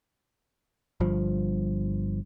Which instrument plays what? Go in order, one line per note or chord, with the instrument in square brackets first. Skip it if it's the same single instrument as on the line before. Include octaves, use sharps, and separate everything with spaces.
[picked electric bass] G1 G2 F3